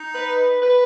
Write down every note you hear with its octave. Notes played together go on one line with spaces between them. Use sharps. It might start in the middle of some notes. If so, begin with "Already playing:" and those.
Already playing: D#4
B4
B4